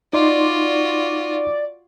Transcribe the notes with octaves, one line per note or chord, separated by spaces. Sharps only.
D#4 F4 F#4 D5 C6